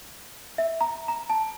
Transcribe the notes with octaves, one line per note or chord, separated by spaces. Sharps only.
E5
A#5
A#5
A5